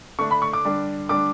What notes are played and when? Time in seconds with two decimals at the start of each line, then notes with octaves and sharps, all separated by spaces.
0.19 D3 A3 D4 C#6
0.31 B5
0.42 C#6
0.53 D6
0.65 D3 G3 D4
1.09 D3 G3 D4 D6